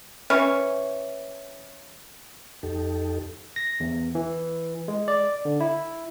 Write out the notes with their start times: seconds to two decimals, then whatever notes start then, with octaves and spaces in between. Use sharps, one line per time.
0.30 E3 C#4 C#5
2.63 F2 D#4 G4 A4
3.56 A#6
3.80 E2
4.15 E3
4.88 G#3
5.08 D5
5.45 D3
5.61 E4